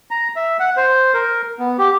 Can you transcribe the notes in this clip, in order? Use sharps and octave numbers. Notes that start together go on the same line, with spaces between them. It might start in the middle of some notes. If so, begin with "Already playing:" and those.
A#5
E5
F#5
C5
A#4
B3
G4